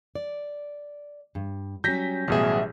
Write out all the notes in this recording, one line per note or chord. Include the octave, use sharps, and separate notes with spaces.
D5
G2
F#3 G3 C#4 G6 A#6 B6
A1 B2 F#3 G3 G#4 E5